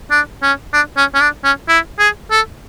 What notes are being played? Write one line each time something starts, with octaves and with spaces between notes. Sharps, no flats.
D4
C#4
D4
C#4
C#4
D4
C#4
E4
G#4
A4